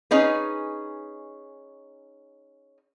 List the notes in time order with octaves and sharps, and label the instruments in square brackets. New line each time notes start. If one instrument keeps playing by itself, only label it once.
[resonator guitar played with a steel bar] C#4 D#4 G#4 B4